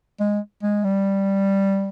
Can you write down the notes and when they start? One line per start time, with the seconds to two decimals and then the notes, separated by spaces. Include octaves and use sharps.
0.20 G#3
0.63 G#3
0.84 G3